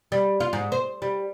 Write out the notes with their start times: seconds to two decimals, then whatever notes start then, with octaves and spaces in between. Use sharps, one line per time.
0.12 G3
0.40 F4
0.53 G#2
0.72 C5
1.02 G3